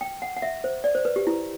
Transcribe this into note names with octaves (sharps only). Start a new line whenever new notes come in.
G5
F#5
F#5
E5
C5
D5
C5
B4
G4
E4